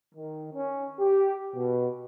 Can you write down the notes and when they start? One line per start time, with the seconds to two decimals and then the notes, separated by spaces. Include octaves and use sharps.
0.14 D#3
0.53 C#4
0.99 G4
1.55 B2